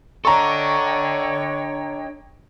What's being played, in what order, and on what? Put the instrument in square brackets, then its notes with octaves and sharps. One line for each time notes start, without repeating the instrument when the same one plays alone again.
[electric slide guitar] D4 A4 [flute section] C#5 D#5 G5 [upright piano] A#5 C#6